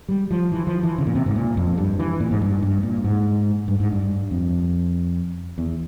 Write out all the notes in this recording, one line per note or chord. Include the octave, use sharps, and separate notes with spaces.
G3
F3
E3
F3
E3
C#3
A#2
C3
G#2
A#2
F2
G2
E3
A#2
G#2
G2
G2
A#2
G#2
G2
G#2
G2
F2
E2